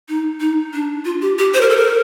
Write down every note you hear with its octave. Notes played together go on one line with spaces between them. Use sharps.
D#4
D#4
D4
F4
G4
G4
C5
A#4
A4
A#4